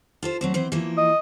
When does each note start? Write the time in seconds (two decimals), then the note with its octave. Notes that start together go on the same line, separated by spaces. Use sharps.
0.23 F4 A4 C5
0.41 F#3 A3 C4
0.54 E3 C4 C5
0.72 E3 F3 A#3
0.97 D#5